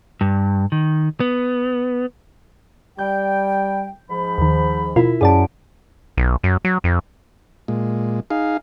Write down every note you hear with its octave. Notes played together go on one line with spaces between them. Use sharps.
G2
D#3
B3
G3 G5 G6
G#2 F3 B5
D#2 D#3
B2 E4 F4 A#4
F#2 G#4 D5 A5 D7
B1
F#2
F#3
F2
A#2 G#3
D#4 G#4 F5